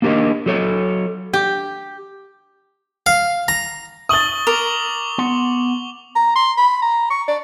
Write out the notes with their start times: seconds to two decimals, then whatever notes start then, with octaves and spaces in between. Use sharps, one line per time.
0.02 A#3 D4 G4 A4 A#4
0.46 F#3 A4 C#5
1.33 G4
3.06 F5
3.48 A#5
4.09 C#6 D#6 A6 F#7 G7
4.47 A#4 D6 F7
5.18 B3 F#5 C6
6.16 A#5
6.35 C6
6.57 B5
6.82 A#5
7.10 C#6
7.28 D5